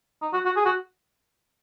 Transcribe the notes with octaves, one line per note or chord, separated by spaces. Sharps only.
D#4
F#4
F#4
G#4
F#4